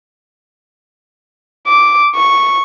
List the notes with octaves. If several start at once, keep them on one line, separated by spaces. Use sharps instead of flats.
D6
C#6